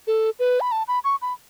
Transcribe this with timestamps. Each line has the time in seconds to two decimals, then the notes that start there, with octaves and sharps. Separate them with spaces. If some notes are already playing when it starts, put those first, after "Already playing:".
0.07 A4
0.39 B4
0.60 B5
0.72 A5
0.88 B5
1.04 C#6
1.22 B5